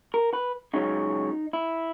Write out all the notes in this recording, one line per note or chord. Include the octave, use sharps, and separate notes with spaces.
A#4
B4
C#2 C#3 F#3 C#4 D#4
E4